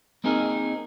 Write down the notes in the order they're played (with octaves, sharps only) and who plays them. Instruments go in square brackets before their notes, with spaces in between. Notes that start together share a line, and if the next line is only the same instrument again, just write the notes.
[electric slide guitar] A#3 C4 D#4 G#4 A#4